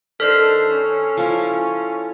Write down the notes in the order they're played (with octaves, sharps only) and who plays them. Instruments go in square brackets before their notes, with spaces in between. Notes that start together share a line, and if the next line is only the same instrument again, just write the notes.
[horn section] D#3 D4 C5 [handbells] A4 F6 B6
[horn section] C#4
[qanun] F3 E4